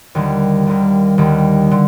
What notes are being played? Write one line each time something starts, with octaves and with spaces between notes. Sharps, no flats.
D#2 D3 G3
D#2 D3 G3
D#2 D3 G3
D3